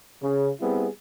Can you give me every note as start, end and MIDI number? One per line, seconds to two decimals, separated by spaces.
0.22 0.49 49
0.60 0.87 55
0.60 0.87 59
0.60 0.87 60
0.60 0.87 64
0.60 0.87 68